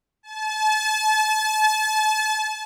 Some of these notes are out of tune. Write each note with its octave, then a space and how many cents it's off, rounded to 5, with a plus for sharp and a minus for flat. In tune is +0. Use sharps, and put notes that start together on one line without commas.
A5 -35